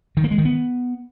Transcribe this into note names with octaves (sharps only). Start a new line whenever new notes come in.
D#3
A#3
G#3
D#3
B3